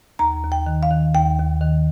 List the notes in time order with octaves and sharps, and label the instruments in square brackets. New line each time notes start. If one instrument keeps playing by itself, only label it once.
[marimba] D#2 A#5
D#2
G5
D#3
F5
D#3
D#2 G5
D#2
D#3